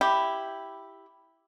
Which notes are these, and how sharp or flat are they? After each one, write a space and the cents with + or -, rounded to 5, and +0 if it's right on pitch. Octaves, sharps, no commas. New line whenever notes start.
E4 +0 G4 +0